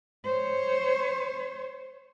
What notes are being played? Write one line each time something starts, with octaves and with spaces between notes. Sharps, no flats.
C5 C#5